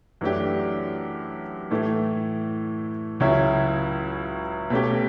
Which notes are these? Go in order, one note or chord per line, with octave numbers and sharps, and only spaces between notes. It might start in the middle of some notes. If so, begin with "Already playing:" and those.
F#2 E3 A3 D4 G4
A2 E3 A3
C#2 C#3 F#3 C#4 E4
B2 A3 C#4 G4